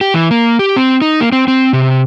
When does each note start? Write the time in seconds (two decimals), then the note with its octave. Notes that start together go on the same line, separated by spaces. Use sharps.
0.01 G4
0.14 E3
0.31 A#3
0.59 G4
0.76 C4
1.02 D#4
1.21 A#3
1.32 C4
1.48 C4
1.73 C3